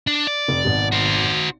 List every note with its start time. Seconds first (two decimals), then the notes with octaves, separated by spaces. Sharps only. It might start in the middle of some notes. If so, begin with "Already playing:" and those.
0.07 D4
0.27 D5
0.48 F1
0.65 G#1 B2
0.92 F#4 C5